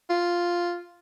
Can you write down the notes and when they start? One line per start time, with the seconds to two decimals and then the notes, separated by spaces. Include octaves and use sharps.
0.10 F4